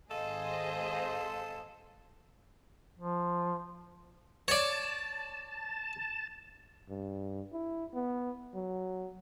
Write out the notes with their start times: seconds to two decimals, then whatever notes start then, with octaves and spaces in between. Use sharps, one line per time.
0.11 G#1 G#4 A4 C5 D#5 F5
2.98 F3
4.48 C#5 D5 A5
6.89 G2
7.53 E4
7.94 B3
8.54 F#3